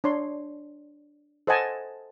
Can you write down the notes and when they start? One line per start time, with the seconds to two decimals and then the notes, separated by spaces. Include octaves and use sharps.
0.04 D4 C#5 C6
1.47 A4 C5 D#5 F#5 G#5 A5